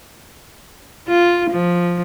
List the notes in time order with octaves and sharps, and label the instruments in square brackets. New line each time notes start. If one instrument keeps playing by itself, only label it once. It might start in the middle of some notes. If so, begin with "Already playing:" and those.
[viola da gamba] F4
F3